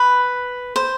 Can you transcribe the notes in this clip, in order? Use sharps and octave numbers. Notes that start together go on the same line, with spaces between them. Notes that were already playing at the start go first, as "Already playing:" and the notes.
Already playing: B4
C5